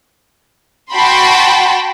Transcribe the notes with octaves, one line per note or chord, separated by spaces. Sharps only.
F#4 G5 A5 B5 C6